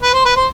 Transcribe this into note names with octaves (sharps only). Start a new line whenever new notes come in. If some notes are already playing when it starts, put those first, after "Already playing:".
B4
C5
B4
C5